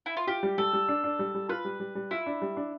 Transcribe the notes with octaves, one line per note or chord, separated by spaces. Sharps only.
E4
F4
F4 G4
G3
G3 A4
G3
D4
D4
G3
G3
F4 B4
G3
G3
G3
E4 F4
D4
G3
D4